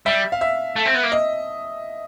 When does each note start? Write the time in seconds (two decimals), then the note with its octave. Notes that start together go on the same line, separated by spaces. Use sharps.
0.06 G3 E5
0.32 F5
0.41 E5
0.76 A3
0.86 C4
0.95 B3
1.03 A#3
1.12 D#5